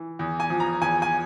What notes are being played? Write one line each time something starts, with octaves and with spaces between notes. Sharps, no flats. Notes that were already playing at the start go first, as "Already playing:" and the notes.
Already playing: E3
E2
G#5
F3
A#5
E2 G#5
G#5